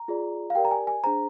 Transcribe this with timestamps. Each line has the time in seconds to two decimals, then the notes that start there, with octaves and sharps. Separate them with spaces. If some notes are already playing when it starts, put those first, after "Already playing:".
Already playing: A#5
0.08 F4 G#4 D5
0.50 F5
0.55 G4 A#4 D5 G5
0.65 A#5
0.71 G#5
0.87 G#5
1.04 D4 G#4 C5 A#5